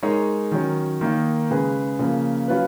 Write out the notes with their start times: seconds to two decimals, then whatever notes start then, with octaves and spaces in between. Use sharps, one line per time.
0.03 G#3 D#4 A#4 C#5
0.52 D#3 F#3 C#4
1.01 D#3 A#3 D#4
1.50 C#3 G#3 C#4 G#4 B4
1.99 C#3 F3 A#3
2.48 F#3 C#4 F4 B4